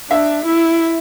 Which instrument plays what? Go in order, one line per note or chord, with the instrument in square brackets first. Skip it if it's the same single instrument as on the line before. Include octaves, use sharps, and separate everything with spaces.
[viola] D4 [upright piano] E5
[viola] E4